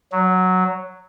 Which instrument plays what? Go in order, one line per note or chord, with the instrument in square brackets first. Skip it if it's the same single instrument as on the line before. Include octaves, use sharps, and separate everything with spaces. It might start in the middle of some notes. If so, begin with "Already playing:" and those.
[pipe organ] F#3